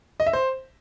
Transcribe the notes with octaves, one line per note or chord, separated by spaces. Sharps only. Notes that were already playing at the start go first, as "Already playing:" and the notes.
D#5
E5
C5